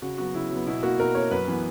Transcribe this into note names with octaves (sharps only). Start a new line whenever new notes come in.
C#3 F#4
F#3 B3 F#4
C#3 E4
F#3 B3
B2 E4
A#3 F#4
B2 A#4
A#3 C#5
F#2 B4
E3 B3